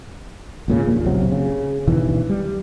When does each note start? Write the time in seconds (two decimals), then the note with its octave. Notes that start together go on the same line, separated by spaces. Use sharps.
0.68 G#1 A#2 C#3
0.87 A#1 D#2 A#2
1.05 F#1 B1 C3 F#3
1.32 C#3
1.87 G2 B2 D#3 E3
2.30 G3